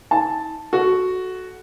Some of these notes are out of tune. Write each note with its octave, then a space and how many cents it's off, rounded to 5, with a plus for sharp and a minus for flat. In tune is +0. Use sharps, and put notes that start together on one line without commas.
D#4 +45 A5 +0
F#4 +0 A4 -20